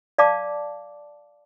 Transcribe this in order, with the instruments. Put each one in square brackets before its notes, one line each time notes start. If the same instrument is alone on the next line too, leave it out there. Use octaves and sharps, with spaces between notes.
[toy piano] D5 F5 A5 D6